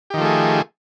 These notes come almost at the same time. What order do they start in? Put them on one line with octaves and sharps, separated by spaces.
G4 D#3 F3 A3 G#4